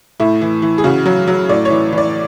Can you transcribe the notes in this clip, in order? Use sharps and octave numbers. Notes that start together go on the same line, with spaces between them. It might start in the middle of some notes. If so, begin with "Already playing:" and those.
A2 E4
E3
E3
G#4
C#3 F#4
F#3
F#3
A2 D5
C#5
E3
E3
D5